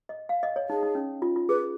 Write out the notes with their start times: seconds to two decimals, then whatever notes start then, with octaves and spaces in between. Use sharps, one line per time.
0.09 D#5
0.29 F5
0.43 D#5
0.56 C#5
0.69 D#4 G#4
0.83 D#4
0.95 C#4
1.22 F4
1.36 F4
1.49 G#4 B4